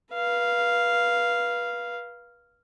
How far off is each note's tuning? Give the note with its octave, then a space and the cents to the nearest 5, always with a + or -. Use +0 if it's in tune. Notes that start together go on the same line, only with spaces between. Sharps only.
B4 -30 F5 -5